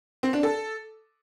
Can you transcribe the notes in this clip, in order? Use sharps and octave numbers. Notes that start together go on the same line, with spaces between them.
C4
D4
A4